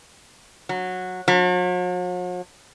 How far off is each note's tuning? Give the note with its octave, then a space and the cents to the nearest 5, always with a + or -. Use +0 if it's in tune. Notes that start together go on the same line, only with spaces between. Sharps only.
F#3 -15
F#3 -45